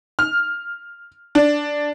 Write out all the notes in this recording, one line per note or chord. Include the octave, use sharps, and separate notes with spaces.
F6
D4